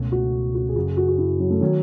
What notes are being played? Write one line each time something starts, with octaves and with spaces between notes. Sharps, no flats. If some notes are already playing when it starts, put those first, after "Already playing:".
Already playing: C#2 B2 A3 C#4
F#4
F#4
G#4
F#1 F#2 C#3 F#4
G#4
F#4
F#4
E4
F#3
A3
D#3 F#3 A3 C#4